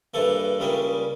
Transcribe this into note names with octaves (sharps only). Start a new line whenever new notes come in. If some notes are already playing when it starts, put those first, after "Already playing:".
G2 E3 A#3 A4
C#2 C#3 G3 A#3